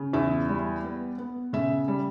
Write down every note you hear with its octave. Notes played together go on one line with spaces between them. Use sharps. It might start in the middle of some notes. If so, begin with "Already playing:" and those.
Already playing: C#3
E2 E5
G3
B3
B3
C#3 E5
G3